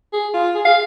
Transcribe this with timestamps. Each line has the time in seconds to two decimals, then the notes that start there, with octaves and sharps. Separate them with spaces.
0.13 G#4
0.34 F4
0.55 G#4
0.65 G#4 F5